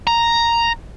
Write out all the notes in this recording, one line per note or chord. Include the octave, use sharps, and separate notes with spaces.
A#5